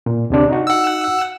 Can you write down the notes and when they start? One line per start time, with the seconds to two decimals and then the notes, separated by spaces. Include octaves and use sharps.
0.06 A#2
0.30 D2 C3 D4
0.49 D#4 F#4
0.67 F#5 E6